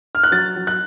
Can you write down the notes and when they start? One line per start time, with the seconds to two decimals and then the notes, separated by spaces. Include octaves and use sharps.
0.15 F6
0.24 F#6
0.31 F#3 A6
0.56 F#3
0.67 F#6